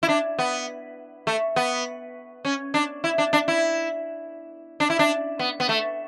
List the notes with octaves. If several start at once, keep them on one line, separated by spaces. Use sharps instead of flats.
E4
D4
B3
A3
B3
C#4
D4
E4
D4
D4
E4
D4
E4
D4
B3
B3
A3